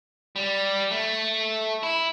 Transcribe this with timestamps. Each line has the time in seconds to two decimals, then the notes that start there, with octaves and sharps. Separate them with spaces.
0.36 G3
0.91 A3
1.83 E4